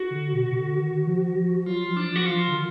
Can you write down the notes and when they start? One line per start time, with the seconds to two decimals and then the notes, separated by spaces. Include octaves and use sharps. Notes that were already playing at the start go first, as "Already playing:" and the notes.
Already playing: F#4
0.10 D3
0.33 B2
0.49 B2
0.55 D3
0.77 D#3
1.07 F3
1.37 F3
1.66 F#3 F4
1.89 F3
1.96 D4
2.10 F3
2.16 F#4
2.26 F4
2.34 F3
2.47 D3
2.55 D#3